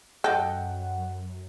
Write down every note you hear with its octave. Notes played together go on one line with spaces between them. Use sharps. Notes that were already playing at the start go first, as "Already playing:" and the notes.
F#2 A4 D#5 F#5 G5